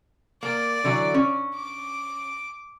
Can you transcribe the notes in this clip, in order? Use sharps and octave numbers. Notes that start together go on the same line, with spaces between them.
A#3 D5
D3 E3 F#3
C#4
D6